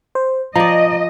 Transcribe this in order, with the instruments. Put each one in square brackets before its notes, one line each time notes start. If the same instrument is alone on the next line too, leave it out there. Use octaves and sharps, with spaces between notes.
[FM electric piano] C5
[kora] F3 D5 [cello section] D#5 [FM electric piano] A#5